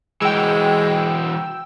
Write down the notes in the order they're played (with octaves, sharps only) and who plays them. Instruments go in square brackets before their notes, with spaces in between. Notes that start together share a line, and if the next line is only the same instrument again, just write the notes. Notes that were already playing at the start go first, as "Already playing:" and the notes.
[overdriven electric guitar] E3 F#3 [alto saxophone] G#3 [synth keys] G5 E6